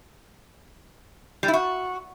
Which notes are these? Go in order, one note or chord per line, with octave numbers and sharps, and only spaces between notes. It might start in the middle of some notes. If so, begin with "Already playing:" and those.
G3
E4
F#4